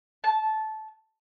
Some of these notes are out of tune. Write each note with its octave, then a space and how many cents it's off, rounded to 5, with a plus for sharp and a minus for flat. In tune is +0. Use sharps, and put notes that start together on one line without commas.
A5 -15